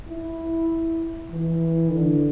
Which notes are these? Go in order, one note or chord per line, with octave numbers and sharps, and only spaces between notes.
E4
E3
D3